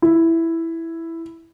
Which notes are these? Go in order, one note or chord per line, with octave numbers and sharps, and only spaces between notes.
E4